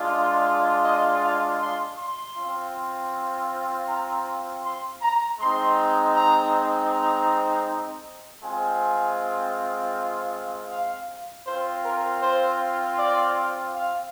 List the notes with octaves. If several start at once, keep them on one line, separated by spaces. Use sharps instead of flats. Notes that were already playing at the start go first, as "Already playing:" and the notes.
Already playing: G#3 D4 F4
D#5
F5
C6
C6
C4 F4
A#5
C6
A#5
G#3 C4 D#4 C6
A#5
A#5
G#3 C4 F4 G#5
F5
C4 F4 C5
A#4
C5
D5
F5